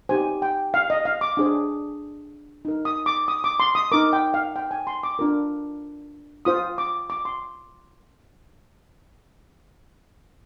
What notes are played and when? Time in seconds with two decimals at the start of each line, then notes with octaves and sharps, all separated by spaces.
0.09 D#4 G4 C5 G#5
0.42 G5
0.74 F5
0.90 D#5
1.05 F5
1.21 D6
1.37 D4 G#4 C5
2.65 D#4 A#4
2.85 D#6
3.06 D6
3.28 D#6
3.44 D6
3.60 C6
3.75 D#6
3.92 D#4 A#4 D6
4.13 G5
4.34 F5
4.56 G5
4.71 G#5
4.87 C6
5.03 D6
5.19 D4 F4 A#4
6.45 F4 C5 D#6
6.78 D6
7.10 D6
7.25 C6